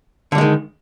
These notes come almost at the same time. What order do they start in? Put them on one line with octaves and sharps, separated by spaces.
D3 G3 G#3 D#3